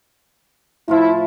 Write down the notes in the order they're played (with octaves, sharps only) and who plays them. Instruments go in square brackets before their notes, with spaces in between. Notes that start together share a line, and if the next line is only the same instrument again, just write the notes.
[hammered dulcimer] A2 F3 F4 [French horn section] E4